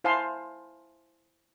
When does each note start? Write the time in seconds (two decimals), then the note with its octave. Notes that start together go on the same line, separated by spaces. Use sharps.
0.04 E4 C5 F5 G#5 A5 C6